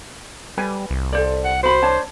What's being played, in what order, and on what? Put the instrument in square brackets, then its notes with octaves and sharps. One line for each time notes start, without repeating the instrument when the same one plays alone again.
[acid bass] G3 [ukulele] B4 G#5
[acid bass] C2
[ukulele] A4 C5 D5
[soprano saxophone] F#5
[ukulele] F#4 B5 [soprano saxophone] C5
[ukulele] D4 C#5 A5